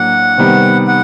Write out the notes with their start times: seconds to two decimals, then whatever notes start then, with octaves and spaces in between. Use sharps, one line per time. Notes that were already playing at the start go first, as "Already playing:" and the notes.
Already playing: A2 F#3 A#3 D4 F#5
0.38 C3 D#3 G3 B3 D#4
0.87 F#5